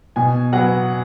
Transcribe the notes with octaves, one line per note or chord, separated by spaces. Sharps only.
B2 G#5
F#3 B3 F#5